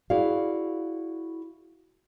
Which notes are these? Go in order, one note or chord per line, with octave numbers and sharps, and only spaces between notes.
E4 F#4 G#4 D5 F5